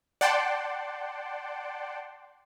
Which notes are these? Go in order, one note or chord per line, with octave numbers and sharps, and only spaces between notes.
D5 F#5 G5 A5 C6